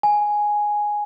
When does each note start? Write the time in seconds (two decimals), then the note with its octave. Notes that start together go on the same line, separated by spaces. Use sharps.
0.03 G#5